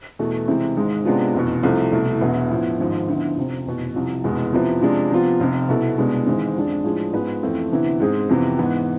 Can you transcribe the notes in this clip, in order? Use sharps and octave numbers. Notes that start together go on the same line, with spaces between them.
E2 B2 A3
C3 E3 G#3 C4 E4
G#1 G#2 G#3
C3 G#3 B3 D4 F4
F1 E2 B2
C2 C3 F3 A3
C2 B2 A3 E4
E1 E2 B2 B3 E4
A2 F3 B3 E4
G#1 G#2 F3
D2 D3 F3 B3 E4
F1 F2 C3
F1 E2 B2
C2 C3 F3
F1 E2 B2 G#3 B3
C3 F3 B3 E4 B4
C3 F3 G#3 D4
C3 F3 B3 F4
F1 F2 C3
C2 B2 B3 E4 A4
C2 B2 G#3 B3 D4
G#1 G#2 E3 G#3 C4
F2 D3 G#3 D4
A2 F3 G#3 D4 G#4
G#2 G#3 B3 F4 B4
F2 E3 A3 C4 E4
D2 C3 E3 B3 E4
G#2 G#3 C4 G#4
F2 C3 E3 B3
G#2 E3 B3